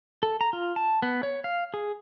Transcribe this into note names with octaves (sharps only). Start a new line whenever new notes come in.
A4
A#5
F4
A5
B3
C#5
F5
G#4